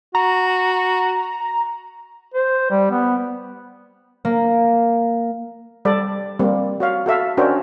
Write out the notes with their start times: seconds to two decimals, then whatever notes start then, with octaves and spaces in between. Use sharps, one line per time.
0.15 F#4 A#5
2.34 C5
2.70 G3
2.91 B3
4.25 A#3
5.85 G3 A4 D5
6.39 G3 A#3 C4
6.80 F#4 C#5 F5
7.06 F#4 A4 E5 F5
7.37 C#4 D4 F#4 A#4 C5 G5